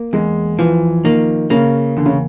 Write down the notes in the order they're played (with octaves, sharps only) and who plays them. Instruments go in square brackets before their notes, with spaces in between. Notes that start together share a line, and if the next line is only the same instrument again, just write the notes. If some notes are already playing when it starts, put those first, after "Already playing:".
Already playing: [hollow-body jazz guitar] A#3
[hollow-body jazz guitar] E2 [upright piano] G#3
[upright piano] E3 [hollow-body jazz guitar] F3
[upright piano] D#3 [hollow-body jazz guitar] A#3
[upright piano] C#3 [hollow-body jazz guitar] A#3
[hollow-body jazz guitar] E2 [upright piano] D3
[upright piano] C#3